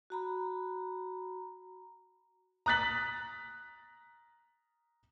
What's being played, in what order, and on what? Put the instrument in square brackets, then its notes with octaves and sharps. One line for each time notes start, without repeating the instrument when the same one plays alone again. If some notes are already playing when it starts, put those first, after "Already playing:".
[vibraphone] F#4 A#5 B5
[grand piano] A#5 D#6 F#6 A6 B6 F#7